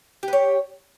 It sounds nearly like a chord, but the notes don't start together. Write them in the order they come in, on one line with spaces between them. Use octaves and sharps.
G4 B4 C#5